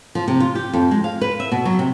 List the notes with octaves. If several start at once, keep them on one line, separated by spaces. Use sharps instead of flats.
F3
C3
F4
G4
F2
G#3
F5
B4
E5
B2
F#3
C3